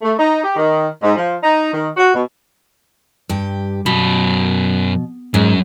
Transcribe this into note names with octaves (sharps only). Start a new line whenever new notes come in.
A3
D#4
G4
D#3
G#2
F3
D#4
D#3
F#4
B2
G2 G4
F#2 B2 B5
G#2 F#3 C#4